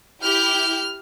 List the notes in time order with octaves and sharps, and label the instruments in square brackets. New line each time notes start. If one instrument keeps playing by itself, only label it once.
[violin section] E4 G4 G6 [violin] F6